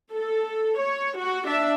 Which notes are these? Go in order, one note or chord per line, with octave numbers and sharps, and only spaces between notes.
A4
C#5
F#4
D4 E5